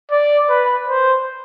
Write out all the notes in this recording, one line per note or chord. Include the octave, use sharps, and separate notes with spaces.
D5
B4
C5